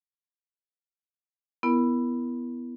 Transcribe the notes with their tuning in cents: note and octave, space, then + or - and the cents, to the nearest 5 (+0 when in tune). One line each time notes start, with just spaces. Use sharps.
B3 +0 E4 +20 A#4 +0